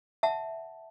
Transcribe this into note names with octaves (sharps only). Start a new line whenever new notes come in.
E5 F#5 A5